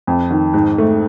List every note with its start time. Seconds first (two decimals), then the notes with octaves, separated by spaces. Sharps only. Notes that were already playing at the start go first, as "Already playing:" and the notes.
0.07 F2
0.31 D#3
0.54 G#2
0.78 A3